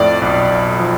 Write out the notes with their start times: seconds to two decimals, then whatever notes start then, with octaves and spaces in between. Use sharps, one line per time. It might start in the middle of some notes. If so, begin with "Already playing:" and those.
Already playing: F2 A2 D5
0.22 B1
0.50 B1
0.80 F3